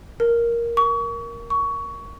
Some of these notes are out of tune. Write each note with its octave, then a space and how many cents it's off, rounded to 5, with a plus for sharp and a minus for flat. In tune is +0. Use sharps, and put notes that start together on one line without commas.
A#4 +5
C#6 +35
C#6 +20